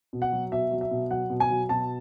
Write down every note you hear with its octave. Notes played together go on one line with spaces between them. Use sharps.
B2
F#5
F#3
B2 E5
F#3
E5
B2
F#3 F#5
B2
G#5
F#3
B2 A5